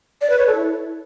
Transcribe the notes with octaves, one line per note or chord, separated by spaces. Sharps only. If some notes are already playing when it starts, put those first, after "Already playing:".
D5
B4
C#5
A4
E4